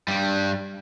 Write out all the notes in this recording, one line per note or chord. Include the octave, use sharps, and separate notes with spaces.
G2 G3